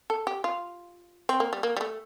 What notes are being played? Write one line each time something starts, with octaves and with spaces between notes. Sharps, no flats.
A4
G4
F4
C4
A#3
G3
A#3
G3
A3